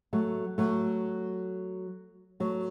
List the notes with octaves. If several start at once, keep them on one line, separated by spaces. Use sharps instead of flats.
F#3 A3
F#3 A3
F#3 A3